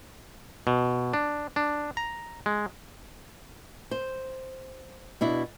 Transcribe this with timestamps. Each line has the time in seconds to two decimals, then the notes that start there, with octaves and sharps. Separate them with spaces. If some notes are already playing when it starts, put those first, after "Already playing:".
0.67 B2
1.14 D4
1.56 D4
1.97 A#5
2.46 G#3
3.91 C5
5.21 B2 D4 E4